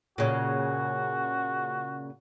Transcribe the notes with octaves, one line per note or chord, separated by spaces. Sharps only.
A#2 C#3 F#4